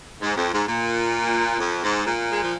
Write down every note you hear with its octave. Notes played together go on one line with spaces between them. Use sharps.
G#2
F2
G#2
A#2
F2
G#2
A#2
G#3
F3